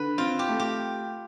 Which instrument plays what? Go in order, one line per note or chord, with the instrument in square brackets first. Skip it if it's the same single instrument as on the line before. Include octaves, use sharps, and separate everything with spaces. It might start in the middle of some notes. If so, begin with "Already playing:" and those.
Already playing: [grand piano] D3 [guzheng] B4
[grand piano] C4 [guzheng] F4
[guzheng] G4
[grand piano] A3
[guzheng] G4